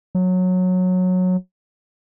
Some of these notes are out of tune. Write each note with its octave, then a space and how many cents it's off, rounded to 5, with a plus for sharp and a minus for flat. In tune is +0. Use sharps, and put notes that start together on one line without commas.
F#3 -15